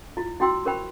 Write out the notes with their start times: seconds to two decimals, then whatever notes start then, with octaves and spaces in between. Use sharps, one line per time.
0.17 E4 F4
0.40 E4 F#4 G5 C6 E6
0.65 G4 A#4 C5 G5 B5